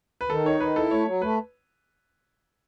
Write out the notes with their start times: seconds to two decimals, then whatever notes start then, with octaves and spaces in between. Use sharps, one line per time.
0.21 B4
0.30 D#3 A4
0.45 D#4 C#5
0.60 D#3 B4
0.76 E4 A4
0.91 A3 C#5
1.07 F#3
1.22 A3 B4